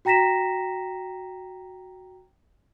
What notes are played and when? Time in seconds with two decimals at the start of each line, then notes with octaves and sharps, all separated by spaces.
0.05 F#4 G5 A#5 A#6 B6 E7